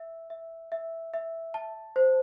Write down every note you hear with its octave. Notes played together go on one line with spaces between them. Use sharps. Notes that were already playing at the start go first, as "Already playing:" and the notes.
Already playing: E5
E5
E5
E5
A5
C5